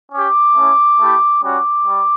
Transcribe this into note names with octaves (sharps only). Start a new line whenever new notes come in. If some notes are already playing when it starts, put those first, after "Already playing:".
C#4 G4 D6
A3 C#4 E4
A3 E4 G4
G3 C#4 F#4 D6
G3